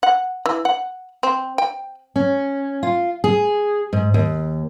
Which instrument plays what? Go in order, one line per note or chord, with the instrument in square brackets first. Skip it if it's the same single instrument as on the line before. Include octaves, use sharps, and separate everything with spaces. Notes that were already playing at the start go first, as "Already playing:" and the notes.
[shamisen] F#5
E3
F#5
C4
G5
[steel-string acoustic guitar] C#4
F4
G#4
G#2
D#2